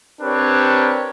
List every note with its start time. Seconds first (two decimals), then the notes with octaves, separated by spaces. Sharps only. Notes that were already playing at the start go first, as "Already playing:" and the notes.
0.22 C4 D4 G4 A#4 B4 C#5